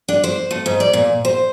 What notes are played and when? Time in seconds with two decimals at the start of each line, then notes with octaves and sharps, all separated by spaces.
0.08 D4
0.24 C5
0.51 A3
0.66 G#2
0.80 D5
0.93 A#2
1.25 C5